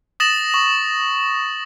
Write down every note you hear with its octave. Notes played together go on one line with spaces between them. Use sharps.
D#6 A6 A#6 E7 F#7
C#6